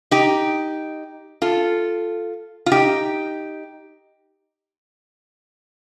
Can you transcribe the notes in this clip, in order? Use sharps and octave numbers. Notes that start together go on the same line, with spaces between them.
D#4 G4
F4 A4
F4
D#4 G4